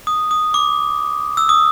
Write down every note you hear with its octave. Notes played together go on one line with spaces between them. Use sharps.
D#6
D#6
D6
E6
D#6